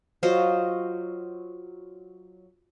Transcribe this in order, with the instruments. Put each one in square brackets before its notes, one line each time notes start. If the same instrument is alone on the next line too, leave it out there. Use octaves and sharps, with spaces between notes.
[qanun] F#3 F4 C5 D#5